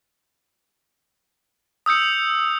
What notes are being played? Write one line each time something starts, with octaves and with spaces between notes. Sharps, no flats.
D#6 E6 G6 C#7